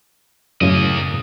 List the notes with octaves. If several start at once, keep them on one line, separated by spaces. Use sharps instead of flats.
F#2 A2 C#3 A#3 D#5